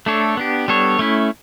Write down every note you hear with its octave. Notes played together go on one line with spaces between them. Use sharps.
A3 D4 A4 C#5
B3 D4 G4
G3 B3 D4 A4 C#5
A3 C#4 E4